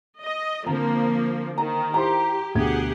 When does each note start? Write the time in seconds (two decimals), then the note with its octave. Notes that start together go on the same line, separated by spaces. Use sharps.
0.21 D#5
0.66 D3 F3 A#3 C4 A#5
1.58 D#3 A#5
1.94 E4 G4 C5 A#5 C6
2.55 D2 B2 G4 G#4 F#5 G#6